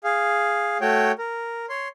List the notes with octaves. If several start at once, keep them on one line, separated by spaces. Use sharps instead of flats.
G#4 F5
A3 F#4 C#5 G5
A#4
C#5 C6